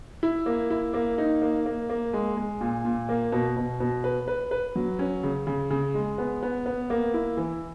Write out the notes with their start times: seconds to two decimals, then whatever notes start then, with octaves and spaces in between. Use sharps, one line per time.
0.23 E4
0.46 A#3
0.70 E4
0.94 A#3
1.18 D#4
1.42 A#3
1.66 A#3
1.90 A#3
2.13 G#3
2.37 G#3
2.61 A#2
2.85 A#2
3.09 A#3
3.32 B2
3.56 B2
3.80 B2
4.04 B4
4.28 B4
4.51 B4
4.76 F#3
4.99 C#4
5.23 C#3
5.47 C#3
5.70 C#3
5.94 G#3
6.18 B3
6.43 B3
6.66 B3
6.90 A#3
7.14 E4
7.37 E3